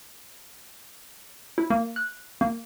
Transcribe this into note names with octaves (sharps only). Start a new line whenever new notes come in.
E4
A#3
F#6
A#3